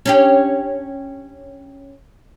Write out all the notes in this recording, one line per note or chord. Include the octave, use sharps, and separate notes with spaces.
C#4 D4 G4